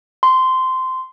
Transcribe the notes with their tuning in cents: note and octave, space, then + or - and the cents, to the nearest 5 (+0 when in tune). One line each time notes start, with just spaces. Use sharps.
C6 -15